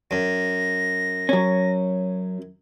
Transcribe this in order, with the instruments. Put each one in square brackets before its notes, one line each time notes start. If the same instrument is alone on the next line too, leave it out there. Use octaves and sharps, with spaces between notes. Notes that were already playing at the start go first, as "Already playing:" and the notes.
[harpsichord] F#2 [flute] A#6
[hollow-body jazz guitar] F#3 C#4